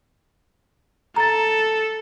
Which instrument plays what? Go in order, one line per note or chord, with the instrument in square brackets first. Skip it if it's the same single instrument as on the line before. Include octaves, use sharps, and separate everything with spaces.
[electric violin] A4 [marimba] A#5 A6